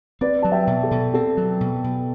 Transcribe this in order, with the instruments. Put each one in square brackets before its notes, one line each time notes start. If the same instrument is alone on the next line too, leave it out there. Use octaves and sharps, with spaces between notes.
[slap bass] C4 [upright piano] B4 D5
[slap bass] F#3 [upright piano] A5
[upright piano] E5 G5
[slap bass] B2
[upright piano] A4
[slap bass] B2
[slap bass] C4 [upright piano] A4
[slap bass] F#3
B2
B2